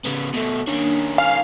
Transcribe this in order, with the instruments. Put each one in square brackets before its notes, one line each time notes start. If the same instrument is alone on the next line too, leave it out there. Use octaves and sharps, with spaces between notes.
[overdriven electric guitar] C#3 B3
B2 A3
[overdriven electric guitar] D#3 C#4 [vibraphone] A#3 D4
[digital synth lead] F5 [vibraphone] G#5